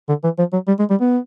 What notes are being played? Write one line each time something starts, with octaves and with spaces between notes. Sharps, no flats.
D3
E3
F3
F#3
G3
G#3
G3
B3